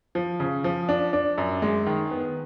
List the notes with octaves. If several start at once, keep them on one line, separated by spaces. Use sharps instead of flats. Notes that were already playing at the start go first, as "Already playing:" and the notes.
F3
C#3
F3
D4
D4
F#2
G#3
D#3
B3